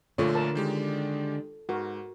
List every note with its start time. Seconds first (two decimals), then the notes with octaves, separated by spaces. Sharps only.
0.18 A#1 A#2 D3 A3 F4 C#5
0.35 A#4 A5
0.55 D#3 G#3 G4
1.69 G#2 F#4 A#4